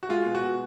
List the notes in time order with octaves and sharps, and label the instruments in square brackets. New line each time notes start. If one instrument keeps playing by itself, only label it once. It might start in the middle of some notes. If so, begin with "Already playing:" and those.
[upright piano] F#4
[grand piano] G#3 [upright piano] F4
[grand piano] B2
[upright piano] F#4
[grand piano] B2